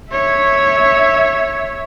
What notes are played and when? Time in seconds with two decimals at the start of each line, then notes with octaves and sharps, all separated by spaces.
0.11 C#5 E5